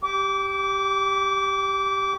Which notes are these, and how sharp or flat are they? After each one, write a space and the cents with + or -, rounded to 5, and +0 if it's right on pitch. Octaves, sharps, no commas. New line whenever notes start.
G4 +0 D6 -25